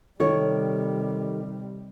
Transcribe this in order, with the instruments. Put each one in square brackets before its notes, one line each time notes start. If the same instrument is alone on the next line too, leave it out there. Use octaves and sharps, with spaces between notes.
[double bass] C3 G3 [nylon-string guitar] D#3 A4 C#5